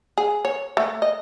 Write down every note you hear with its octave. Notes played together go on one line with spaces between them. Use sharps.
G#4
C#5
A3
D#5